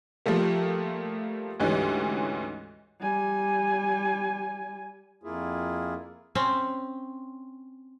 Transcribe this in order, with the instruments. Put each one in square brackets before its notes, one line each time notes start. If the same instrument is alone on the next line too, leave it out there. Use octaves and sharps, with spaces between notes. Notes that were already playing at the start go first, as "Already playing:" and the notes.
[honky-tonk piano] F3 G3 A3 A#3
D2 G#2 E3 G3 C#4
[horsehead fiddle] G3 G#5
[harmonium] F2 A#3 E4 F4 G#4
[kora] C4 C#4